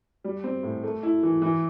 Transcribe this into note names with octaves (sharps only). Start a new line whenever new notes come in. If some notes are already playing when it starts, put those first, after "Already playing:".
G3
C4
A2
A3
E4
E3
E3